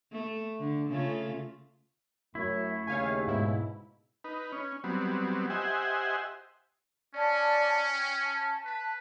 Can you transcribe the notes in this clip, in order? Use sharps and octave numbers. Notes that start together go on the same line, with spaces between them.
A3
D3
C#3 A3 F4
F#2 A3 E4
D#2 C#3 C#5 F5 G#5
G#2 B2 E4
D#4 B4
C#4
F#3 G3 B3 C4
G4 C5 D#5 E5 F#5 G#5
C#4 D5 A5
G5
A5
B4